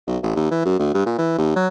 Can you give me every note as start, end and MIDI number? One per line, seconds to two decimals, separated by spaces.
0.07 0.17 35
0.23 0.32 33
0.36 0.51 39
0.51 0.60 52
0.65 0.76 42
0.79 0.94 38
0.94 1.04 43
1.06 1.17 46
1.18 1.36 52
1.38 1.51 39
1.56 1.68 54